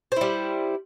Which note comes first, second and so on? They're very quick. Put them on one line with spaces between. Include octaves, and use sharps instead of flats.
C5 E4 G3